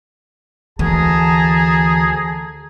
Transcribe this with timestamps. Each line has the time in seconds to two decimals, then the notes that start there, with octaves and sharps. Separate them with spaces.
0.79 D2 E3 G#4 A5 A#5